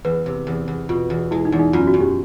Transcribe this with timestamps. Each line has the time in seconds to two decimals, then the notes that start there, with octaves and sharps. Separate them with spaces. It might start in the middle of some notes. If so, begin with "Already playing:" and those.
0.05 E2 B4
0.26 C3
0.47 E2
0.68 E2
0.89 B2 F4
1.10 E2
1.31 G#3 E4
1.45 D#4
1.52 E2
1.59 D#4
1.73 F#2 F4
1.87 F#4
1.94 F#2
2.01 G4